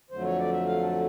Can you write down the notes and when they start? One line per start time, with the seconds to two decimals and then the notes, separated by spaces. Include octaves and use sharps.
0.11 F2 D3 F#3 A3 C5
0.25 C#5
0.38 D5
0.52 E5
0.66 F5
0.84 A5